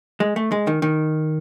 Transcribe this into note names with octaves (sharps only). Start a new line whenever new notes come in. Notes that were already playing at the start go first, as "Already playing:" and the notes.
G#3
A3
G#3
D#3
D#3